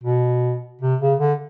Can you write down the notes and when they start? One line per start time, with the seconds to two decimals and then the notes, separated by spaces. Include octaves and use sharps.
0.03 B2
0.81 C3
1.00 C#3
1.20 D3